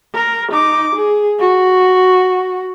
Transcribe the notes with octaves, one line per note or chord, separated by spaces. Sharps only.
A#4
D#4 D6
G#4
F#4